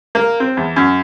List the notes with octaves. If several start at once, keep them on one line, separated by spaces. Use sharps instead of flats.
A#3
C4
E2
F#2